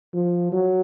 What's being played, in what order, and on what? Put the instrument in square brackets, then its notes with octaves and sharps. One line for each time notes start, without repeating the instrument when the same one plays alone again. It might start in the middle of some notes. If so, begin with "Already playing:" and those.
[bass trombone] F3
F#3